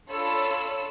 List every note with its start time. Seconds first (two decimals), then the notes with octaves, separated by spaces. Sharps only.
0.10 D4 F4 A4 C#5 B5 E6